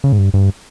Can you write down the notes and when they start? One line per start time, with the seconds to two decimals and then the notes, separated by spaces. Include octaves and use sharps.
0.04 C#3
0.12 G#2
0.19 G2
0.34 G2